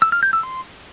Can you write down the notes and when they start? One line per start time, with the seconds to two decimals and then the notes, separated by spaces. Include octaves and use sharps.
0.02 E6
0.12 F6
0.23 G6
0.33 E6
0.43 C6